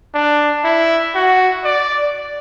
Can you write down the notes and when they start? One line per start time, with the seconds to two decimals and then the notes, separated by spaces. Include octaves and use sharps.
0.14 D4
0.64 E4
1.15 F#4
1.65 D5